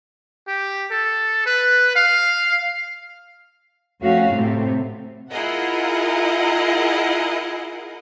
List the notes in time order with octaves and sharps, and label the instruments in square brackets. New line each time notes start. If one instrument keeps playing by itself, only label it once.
[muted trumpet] G4
A4
B4
F5
[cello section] F2 A3 C#4 F#4 F5
A2 C3 A3 C4
[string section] E4 F4 G#4 A#4 D#5 F#5